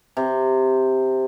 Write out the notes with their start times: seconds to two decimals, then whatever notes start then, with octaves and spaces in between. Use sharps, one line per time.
0.17 C3